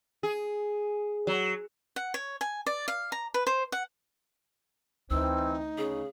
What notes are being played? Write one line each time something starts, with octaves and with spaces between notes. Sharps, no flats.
G#4
F#3
F#5
C#5
G#5
D5
F5
A#5
B4
C5
F#5
D2 E3 C4 D#4 E6
C#3 G#4